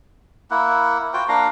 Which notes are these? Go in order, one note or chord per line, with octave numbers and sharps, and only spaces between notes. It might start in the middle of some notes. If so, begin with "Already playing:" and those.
A#3 E4 F#5
F4 F#4 C5 G5
A#3 D4 F5 A#5